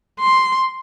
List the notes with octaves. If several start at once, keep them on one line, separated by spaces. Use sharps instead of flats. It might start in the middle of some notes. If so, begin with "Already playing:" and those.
C6